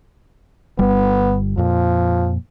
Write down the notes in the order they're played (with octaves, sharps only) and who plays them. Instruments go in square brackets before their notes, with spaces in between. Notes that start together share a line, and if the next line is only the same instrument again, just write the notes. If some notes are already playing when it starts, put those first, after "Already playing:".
[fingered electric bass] G1 G3 [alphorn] B3
[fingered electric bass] F2 A#2 [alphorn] F3